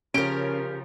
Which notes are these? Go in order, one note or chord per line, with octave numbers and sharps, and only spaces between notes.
C#3 F3 C#4 G4 A#4 D7